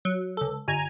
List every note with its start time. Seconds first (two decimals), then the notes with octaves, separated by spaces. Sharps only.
0.05 F#3
0.37 C#2 A4
0.68 G1 G#5 A#5 G#6